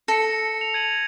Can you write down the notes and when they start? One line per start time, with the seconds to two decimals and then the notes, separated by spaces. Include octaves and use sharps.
0.08 A4 A#6 C#7
0.61 F7
0.74 G#6 D#7 F#7